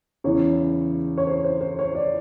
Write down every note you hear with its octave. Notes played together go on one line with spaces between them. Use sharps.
E2 C#3 E3 C#5
C#5
C5
C5
C5
C#5
D5